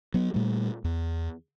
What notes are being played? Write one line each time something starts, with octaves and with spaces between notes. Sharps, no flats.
F#3 B3
A#2 G3 A3
E2